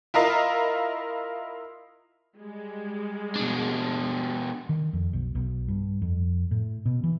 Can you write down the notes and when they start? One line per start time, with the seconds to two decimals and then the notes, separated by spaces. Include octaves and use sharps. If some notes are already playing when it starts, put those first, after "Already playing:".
0.14 E4 F4 A#4 D#5 F5
2.37 G3 G#3
3.36 B2 D4
4.69 D#3
4.93 F2
5.13 B1
5.35 B1
5.68 G2
6.02 F2
6.51 A2
6.86 B2
7.04 E3